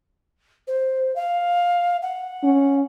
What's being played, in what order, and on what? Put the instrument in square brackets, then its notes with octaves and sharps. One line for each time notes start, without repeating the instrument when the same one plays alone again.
[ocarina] C5
F5
F#5
[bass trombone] C#4